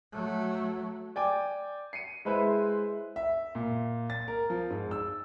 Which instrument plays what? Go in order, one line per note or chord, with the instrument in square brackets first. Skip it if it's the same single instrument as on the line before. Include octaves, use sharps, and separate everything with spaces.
[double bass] F#3 A3
[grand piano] D5 G5 G#5 D6
C7 C#7 D#7
G#3 E4 B4 C5 E5
E5
A#2
A6
A#4
F3
G#2
E6